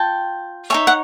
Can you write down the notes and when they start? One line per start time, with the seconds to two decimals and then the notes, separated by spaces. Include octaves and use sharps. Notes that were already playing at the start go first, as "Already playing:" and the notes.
Already playing: F4 G5 A5
0.70 D#4 G#4 C#5 E5
0.87 F#5